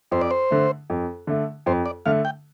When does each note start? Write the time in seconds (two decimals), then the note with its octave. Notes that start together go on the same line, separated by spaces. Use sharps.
0.11 F2 C5
0.21 D5
0.31 C5
0.51 D3 A3
0.90 F2
1.27 D3 A3
1.66 F2 C5
1.86 D5
2.06 D3 A3 F5
2.25 G5